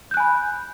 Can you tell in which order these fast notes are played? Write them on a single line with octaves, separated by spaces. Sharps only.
G6 F#6 G#5 B5